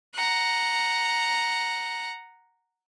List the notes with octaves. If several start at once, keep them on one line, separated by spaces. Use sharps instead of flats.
F#5 A#5